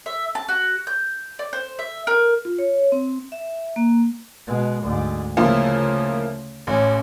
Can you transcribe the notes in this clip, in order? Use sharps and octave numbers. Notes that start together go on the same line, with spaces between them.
E5
A5
F#4
G6
D5
C5
E5
A#4
F4
C#5
C4
E5
A#3
B2 G#3
D2 G#2
C#3 F3 A3 A#3 E4
A1 A2 C#4